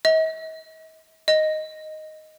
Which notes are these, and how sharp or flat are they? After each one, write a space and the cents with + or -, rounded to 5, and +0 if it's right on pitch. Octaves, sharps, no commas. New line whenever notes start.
D#5 +45
D#5 +0